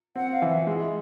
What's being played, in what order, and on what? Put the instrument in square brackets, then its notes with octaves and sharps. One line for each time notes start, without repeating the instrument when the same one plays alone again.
[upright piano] C4 [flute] F#5
[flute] F5
[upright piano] E3
[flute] E5
[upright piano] G#3